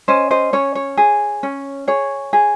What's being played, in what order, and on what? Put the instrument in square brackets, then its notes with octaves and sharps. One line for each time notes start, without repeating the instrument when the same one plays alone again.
[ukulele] C#4 C5 D#5
C5 D#5
C#4 C#5
C#5
G#4
C#4
G#4 C#5
G#4